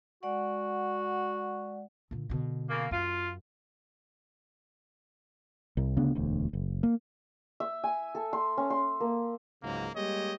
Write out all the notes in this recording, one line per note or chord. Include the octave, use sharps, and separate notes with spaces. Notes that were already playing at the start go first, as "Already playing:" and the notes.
G#3 F#4 D5 F#5
A#2 D3
B2 D3
C#3 A#3
F#2 F4
C2
D2 C#3 B3 D4
E1 D2
F#1
A#3
E5
G#5
A4
C6
C#4
C6
A#3
C#2 G#2 C#3 F#3 A#3
G3 G#3 A#3 G4 C#5 D#5